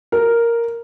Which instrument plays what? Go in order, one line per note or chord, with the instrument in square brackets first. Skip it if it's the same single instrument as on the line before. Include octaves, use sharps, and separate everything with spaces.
[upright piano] A#4